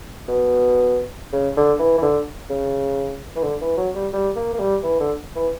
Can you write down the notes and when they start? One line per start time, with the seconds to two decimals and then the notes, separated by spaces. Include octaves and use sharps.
0.28 B2
1.33 C#3
1.57 D3
1.79 E3
1.98 E3
2.02 D3
2.50 C#3
3.36 E3
3.43 D3
3.61 E3
3.77 F#3
3.95 G3
4.13 G3
4.36 A#3
4.53 A#3
4.59 G3
4.83 E3
5.00 D3
5.36 E3